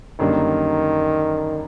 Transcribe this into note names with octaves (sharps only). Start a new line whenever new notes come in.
F#2 D3 D#3 G3 A#3